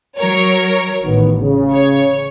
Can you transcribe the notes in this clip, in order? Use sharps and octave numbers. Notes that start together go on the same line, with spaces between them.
F#3 A#4 C#5
A1 D#3 B3
C#3
C#5